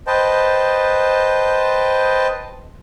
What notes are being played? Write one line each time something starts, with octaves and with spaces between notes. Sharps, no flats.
B4 C5 D#5 G5 A5